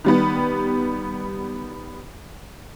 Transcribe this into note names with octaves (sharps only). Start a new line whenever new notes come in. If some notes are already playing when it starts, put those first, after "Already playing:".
D#3 G3 B3